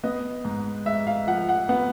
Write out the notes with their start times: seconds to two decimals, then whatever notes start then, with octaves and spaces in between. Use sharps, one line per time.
0.04 B3 D#5
0.45 G#2
0.86 G#3 E5
1.07 F5
1.27 F3 F#5
1.49 F#5
1.69 B3 F#5